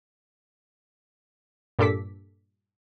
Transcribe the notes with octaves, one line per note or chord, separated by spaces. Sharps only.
G2 A#2 A4 D6 B6